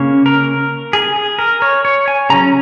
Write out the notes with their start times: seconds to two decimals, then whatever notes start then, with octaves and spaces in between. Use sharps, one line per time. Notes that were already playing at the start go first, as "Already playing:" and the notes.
Already playing: C#3 A#3 C#4 C#5
0.26 A#4
0.93 G#4
1.16 G#4
1.39 A#4
1.62 C#5
1.85 C#5
2.08 G#5
2.30 C#3 F#3 C#4 A#5